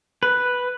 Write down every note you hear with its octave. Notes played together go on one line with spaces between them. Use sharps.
B4